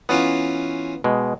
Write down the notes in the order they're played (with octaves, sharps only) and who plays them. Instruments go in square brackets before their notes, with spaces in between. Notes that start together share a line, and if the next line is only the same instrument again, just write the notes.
[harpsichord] E3 C#4 F4 [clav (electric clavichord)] B3
[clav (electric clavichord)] B2 G#3